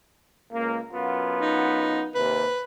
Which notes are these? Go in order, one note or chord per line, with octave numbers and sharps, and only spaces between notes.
C#2 A#3
F#2 B3 F4
D#4
D#2 C3 B4